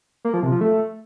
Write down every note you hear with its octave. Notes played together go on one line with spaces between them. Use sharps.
A#3
F3
C3
F3
A3